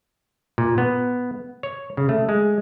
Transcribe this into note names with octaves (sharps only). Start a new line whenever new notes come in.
A#2
B3
C#5
C#3
A3
G#3